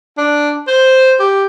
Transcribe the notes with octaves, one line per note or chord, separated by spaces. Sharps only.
D4
C5
G4